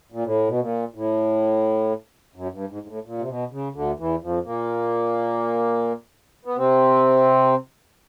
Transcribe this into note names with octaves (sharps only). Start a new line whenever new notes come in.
A#2
A2
B2
A#2
A2
F#2
G2
G#2
G#2
A2
A#2
C3
B2
C#3
D2 D3
E2 E3
F2 F3
A#2 A#3
B3
C3 C4